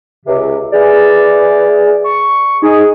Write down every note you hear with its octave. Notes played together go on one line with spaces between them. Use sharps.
C#2 C3
E3 G#4 D5
C#6
D#4 G#4